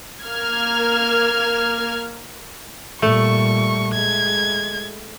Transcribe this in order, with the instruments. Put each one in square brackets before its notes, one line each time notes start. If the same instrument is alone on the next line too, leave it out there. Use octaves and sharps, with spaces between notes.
[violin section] A#3 F6 G#6
[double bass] A#2 G3 [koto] A3 [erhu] C#6
[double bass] G#3 [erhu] G#6